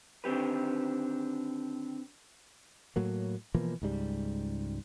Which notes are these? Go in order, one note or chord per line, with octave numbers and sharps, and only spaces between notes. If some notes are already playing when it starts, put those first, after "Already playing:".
D3 D#3 C4 G4 B4
A2 F#3 A#3
B2 E3 F3 A#3
C#2 G#2 G3